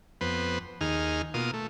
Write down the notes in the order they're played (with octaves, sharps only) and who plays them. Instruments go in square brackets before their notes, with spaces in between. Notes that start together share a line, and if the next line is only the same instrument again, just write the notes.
[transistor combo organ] F2 B3 B4 C5
D#2 D#4 G#4 F6
B2 A#3 F4 D#6
A3